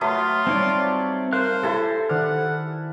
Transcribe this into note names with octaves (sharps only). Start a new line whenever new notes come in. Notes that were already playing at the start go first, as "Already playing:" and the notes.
F#3 A3 F4 B4 D#6
G3 C4 D#4 C#5 D5
A#4 C5 F5 F#6
E4 G4 A4 G#5 A5
D#3 C5 D5 F#5 F6